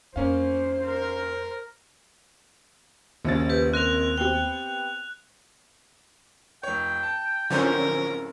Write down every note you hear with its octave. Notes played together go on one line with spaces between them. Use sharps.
F2 A#3 C#4 C5 F5
A#4
A#1 D#2 C#3 A6
G4 B4
C4 A#4 F#6 F7
B3 C4 G4 G5
F1 C#5 G5
A5
D1 D3 F3 C4 C#4 A#4